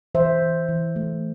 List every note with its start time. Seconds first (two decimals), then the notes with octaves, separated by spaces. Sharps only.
0.15 E3 C5 E5
0.42 E3
0.68 E3
0.96 A3